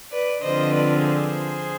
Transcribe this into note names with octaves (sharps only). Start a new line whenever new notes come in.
B4 D5
D3 F3 C4 F4 C5 D#5
B4 D5
G#4 C5